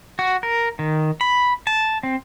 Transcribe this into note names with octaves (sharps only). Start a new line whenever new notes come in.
F#4
A#4
D#3
B5
A5
C4